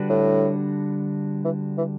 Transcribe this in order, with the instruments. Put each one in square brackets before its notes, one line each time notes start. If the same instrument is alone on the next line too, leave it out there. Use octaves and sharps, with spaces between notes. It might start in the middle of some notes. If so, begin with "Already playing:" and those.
Already playing: [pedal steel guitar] D3 G3 D4 F#4 B4
[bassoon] A2
E3
E3